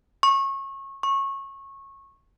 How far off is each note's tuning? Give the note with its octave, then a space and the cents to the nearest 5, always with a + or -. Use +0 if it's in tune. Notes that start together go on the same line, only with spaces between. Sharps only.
C#6 -25
C#6 -20